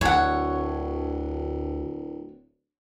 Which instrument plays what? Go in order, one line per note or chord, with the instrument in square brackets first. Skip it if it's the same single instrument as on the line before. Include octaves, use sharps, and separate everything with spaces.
[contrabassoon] D1 [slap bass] D2 [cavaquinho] C#5 F#5